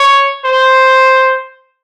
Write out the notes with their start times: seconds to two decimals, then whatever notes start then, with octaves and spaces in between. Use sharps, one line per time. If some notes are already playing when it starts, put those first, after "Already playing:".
Already playing: C#5
0.45 C5